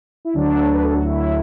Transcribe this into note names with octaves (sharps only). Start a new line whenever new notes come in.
E4
D2 D3 F#3 D4
B4
A4
F#4
E4